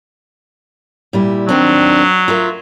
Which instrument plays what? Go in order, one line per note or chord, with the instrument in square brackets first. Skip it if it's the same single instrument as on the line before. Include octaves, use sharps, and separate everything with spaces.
[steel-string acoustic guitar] A#2 G3 E4
[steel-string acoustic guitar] D#3 C4 D4 [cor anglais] F#3
[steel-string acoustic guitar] F4 A#4 E5